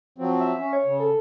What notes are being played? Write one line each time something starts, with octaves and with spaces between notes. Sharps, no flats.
F3 F#3 C4
E5
C#4
C#5
C#3
A4